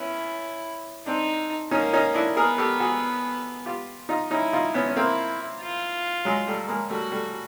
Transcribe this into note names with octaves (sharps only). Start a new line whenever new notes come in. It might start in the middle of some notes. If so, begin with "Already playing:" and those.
Already playing: B3 C#4 E4
C4 D4 D#4
A#3 C#4 D#4
C#4 D#4
D4 E4
B3 G#4 A#4
G4 A4
F#4 G#4
F4 G4
D#4 F4
C#4 D#4 E4
D#4 F4
B3 C#4
C#4
A#3 C4 E4
F4
F#3 G#3
G3 A3
G#3 A#3
G3 A3 F#4
G3 A3